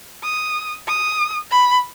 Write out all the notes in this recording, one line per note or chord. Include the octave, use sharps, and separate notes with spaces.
D#6
D#6
B5